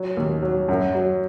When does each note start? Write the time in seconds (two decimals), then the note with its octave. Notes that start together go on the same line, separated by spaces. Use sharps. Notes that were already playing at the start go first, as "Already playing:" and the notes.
Already playing: F#3
0.17 D#2
0.43 F#3
0.69 F#2
0.95 F#3